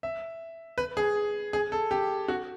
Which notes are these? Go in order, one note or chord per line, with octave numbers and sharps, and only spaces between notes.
E5
B4
G#4
G#4
A4
G4
F#4